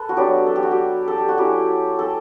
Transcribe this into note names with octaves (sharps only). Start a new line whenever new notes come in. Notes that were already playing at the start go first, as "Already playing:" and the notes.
Already playing: A4 B4
F#4
F#3 B3 D4 G4
A4
G4
F#4
G4
A4
G4
F#4
F#3 C#4 E4 G4
A4